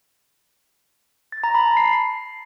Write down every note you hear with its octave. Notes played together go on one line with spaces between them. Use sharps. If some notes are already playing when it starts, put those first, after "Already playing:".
A6
A#5
B5
A5
C7